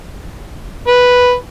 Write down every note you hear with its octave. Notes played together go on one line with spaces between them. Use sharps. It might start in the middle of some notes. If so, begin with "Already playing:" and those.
B4